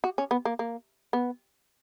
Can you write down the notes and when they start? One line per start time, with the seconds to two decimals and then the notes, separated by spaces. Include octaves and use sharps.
0.04 F#4
0.18 C#4
0.31 B3
0.45 A#3
0.59 A#3
1.13 B3